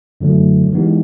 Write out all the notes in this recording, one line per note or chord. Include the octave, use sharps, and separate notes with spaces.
F#2 D3 F#3 A3
E3 G#3 B3 D#4 G4